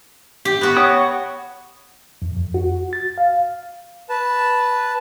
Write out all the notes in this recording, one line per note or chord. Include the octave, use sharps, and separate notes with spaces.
G4
B3 F#4
C#5 G5 D#6
F2
F2
F#4
A6
F5
B4 A5